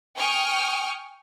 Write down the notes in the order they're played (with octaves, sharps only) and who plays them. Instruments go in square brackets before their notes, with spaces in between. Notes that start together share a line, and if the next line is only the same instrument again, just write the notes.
[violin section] G5 G#5 C#6 D#6 F6